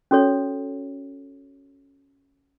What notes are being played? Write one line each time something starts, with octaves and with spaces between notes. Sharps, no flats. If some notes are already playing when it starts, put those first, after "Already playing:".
C#4 F#4 A4 C#5